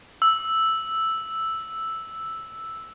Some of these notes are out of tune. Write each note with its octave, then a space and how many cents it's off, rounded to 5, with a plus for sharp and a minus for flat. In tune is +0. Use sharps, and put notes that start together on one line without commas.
E6 +0